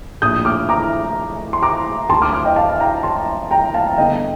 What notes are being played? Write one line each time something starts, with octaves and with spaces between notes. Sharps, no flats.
A#1 A2 D#6 G6
D6 F6
A#5 D6
C6
A#5 D6
D2 D3 A5 C6
D6 F6
D6 F6
D#5 G5
F5 A5
G5 A#5
A5 C6
G5 A#5
F5 A5
G1 G2 D3 D#5 G5